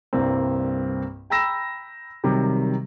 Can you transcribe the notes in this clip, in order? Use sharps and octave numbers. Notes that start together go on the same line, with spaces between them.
C2 G2 A#3 C4
G5 A#5 B5 E6 A#6 E7
C3 D#3 F#3 G3